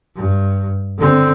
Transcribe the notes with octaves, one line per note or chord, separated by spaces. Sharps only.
G2
D3 C4